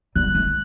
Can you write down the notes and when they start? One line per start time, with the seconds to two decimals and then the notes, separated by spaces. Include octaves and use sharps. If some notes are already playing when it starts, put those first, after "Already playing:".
0.15 G3 F#6
0.35 A3